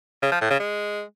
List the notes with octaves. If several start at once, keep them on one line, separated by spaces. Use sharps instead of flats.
C#3
F3
A2
C#3
G#3